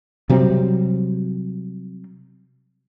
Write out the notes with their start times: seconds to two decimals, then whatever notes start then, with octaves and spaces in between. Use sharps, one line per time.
0.30 C3 F#3 G3 C4